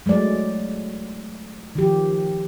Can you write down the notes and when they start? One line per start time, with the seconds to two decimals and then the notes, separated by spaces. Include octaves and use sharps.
0.06 F#3 G#3 A3 D5
1.75 D#3 F3 G4